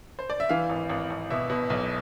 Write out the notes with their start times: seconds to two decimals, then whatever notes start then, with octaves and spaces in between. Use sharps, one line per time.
0.19 C5
0.30 D5
0.40 E5
0.49 E3 F5
0.69 G#1
0.90 G#1
1.10 G#1
1.30 B2 E5
1.50 B2
1.70 B1